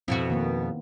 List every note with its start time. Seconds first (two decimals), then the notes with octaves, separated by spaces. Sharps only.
0.08 F2 B2 C4 E4 F#4
0.30 D#3 A#3 B3